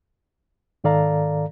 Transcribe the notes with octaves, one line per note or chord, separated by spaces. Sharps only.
G#2 D#3 A4 D5 F5 A#5